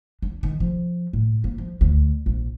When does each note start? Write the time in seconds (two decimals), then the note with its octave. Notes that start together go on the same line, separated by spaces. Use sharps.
0.22 D4
0.43 D#3
0.60 F3
1.13 A2
1.44 A#3
1.58 F3
1.81 D2
2.26 A#1